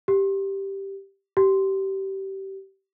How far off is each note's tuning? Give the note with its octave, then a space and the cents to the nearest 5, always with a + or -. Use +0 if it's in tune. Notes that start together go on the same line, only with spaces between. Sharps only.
G4 +0
G4 -25